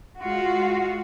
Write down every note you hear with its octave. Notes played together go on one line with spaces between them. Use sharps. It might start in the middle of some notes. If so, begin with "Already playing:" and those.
G#3 F4 F#4